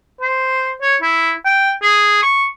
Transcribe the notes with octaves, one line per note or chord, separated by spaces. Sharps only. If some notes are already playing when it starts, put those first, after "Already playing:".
C5
C#5
E4
G5
G#4
C#6